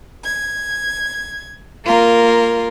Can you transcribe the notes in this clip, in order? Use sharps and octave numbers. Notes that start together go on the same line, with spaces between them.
G#6
A#3 F4 A#4